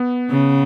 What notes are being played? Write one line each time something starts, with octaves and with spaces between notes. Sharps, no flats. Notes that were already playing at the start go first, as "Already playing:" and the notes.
Already playing: B3
C#3